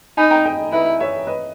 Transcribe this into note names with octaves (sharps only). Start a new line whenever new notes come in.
D#4 G#5 B5
G5 A#5
D#5 G5
E4 B4 D#5
C#5 E5
B4 D#5